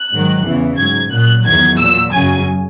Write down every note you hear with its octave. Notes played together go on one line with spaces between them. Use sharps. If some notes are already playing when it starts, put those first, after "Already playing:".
Already playing: F#6
G#2 D#3 F#3
E2 C#3 E3
G#2 F#3 G#6
A#2 F#3 F#6
E2 D#3 F#3 G#6
A#2 F#3 E6
F#2 C#3 F#3 G#5